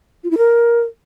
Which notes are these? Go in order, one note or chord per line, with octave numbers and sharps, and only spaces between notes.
F4
E4
A#4